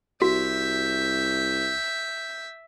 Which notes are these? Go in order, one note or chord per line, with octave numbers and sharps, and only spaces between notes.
C2 F#4 E5 G6